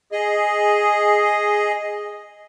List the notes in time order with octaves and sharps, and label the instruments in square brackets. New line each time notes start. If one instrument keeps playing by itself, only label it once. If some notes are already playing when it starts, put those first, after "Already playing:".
[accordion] G#4 D#5